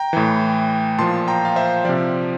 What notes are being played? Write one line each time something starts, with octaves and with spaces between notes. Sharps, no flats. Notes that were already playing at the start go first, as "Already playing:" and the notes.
Already playing: G5 A#5
A2 E3
A#2 F3 A5 C6
G5 A#5
F5
C5 E5
C3 F3 D5 F5